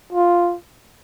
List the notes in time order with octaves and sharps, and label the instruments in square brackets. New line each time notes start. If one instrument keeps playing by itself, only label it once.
[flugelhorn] F4